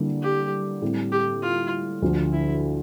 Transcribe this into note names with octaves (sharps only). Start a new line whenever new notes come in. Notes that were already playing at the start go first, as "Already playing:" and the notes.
Already playing: D3 G3 A#3 E4
G4
A2 G3 C4
G4
F4
D2 D3 F3
E4